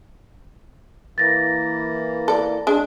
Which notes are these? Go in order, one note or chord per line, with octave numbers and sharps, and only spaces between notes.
E3 A#3 A6 A#6
A4 D5
G#3 D4